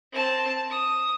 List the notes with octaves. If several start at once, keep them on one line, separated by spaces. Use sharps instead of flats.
C4 A5
D#6